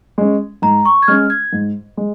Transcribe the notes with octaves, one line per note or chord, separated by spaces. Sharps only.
G#3 C#4
G#2 A#5
C#6
G#6
G#3 C#4 F6
G#6
G#2
G#3